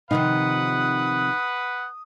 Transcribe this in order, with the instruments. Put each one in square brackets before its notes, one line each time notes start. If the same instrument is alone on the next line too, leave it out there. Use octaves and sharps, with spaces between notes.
[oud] C3 D#3 F3 [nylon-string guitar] D#4 [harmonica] B4 F#5 [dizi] D#6